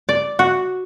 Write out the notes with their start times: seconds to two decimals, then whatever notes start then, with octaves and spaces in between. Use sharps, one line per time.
0.09 D5
0.39 F#4